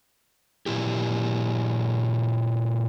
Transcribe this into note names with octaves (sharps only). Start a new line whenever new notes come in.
A#2 E4 G4